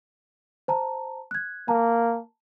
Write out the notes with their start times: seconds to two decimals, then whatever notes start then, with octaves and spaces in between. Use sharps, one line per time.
0.68 C5 A5 A#5
1.31 F#6 G#6
1.68 A#3 A5 A#5